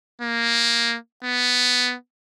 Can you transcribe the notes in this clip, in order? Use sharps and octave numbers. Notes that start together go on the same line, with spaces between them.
A#3
B3